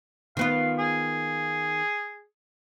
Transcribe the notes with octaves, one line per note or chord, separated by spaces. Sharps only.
D#3 B3 F4 F5
G#4